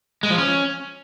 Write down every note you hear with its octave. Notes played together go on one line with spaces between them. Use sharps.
G#3
F3
C#4